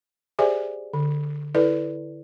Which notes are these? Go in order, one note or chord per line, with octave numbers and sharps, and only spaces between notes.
G4 G#4 C5 D5 E5 G#5
D3
E4 A4 B4 D5